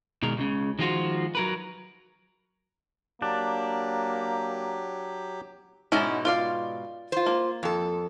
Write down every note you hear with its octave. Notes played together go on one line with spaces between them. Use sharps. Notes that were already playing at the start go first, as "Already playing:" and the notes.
B2 D#3 G#3 A#4
C#2 A2 C#3
D#3 F3 G#3 F4 F#4 C5
F#3 A#4 B4
F#3 A#3 D4 G4
G#2 B2 G#3 C#4 D#4 E4
F4 D5 F5
F4 C5
A#3
F2 A4